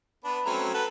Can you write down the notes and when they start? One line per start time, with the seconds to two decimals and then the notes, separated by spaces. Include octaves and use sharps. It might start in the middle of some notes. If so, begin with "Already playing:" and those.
0.24 B3 D4 B4
0.46 A3 C4 C#4 F#4 A#5
0.74 A4 B4 F#5